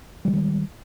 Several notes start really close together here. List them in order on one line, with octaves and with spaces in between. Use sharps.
G3 E3 G#3 D#3